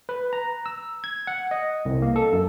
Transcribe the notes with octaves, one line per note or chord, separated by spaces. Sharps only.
B4
A#5
E6
G#6
F#5
D#5
C2
A#3
A4
F#2